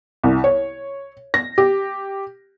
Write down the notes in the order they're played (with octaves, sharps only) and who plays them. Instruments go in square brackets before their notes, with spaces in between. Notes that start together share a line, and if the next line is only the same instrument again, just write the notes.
[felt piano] C2
C#5
A#6
G4